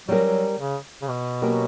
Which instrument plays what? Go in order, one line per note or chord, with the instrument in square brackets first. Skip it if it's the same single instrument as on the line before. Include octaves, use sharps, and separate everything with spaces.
[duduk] F#3 [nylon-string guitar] G3 C#4 G4 A#4
[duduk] F#3
C#3
C#3
B2
[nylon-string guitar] F#3 A#3 C#4 G4 A#4